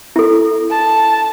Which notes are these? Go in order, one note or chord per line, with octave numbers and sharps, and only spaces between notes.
E4 A4
A5